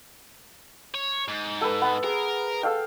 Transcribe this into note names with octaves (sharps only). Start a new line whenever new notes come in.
C#5
G#2
A4 B4
B3
G#4 A#4
A4 F5 G5